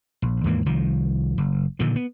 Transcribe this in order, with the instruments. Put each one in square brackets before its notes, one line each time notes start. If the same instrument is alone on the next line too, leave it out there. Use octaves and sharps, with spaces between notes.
[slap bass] A#1
D#2 G#2 E3 A#3
C2 D#3 F3
F#1
A#2 D3 D#3 F3
B3